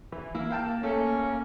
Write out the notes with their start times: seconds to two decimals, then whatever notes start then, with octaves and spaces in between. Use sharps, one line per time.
0.12 E3
0.35 A#3 E4
0.50 F5 G5 A5
0.83 A3 C#4 A4